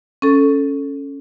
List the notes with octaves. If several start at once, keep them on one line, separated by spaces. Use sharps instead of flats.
C#4 A4